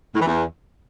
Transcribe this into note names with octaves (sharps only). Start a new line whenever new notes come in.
A2
E3
E2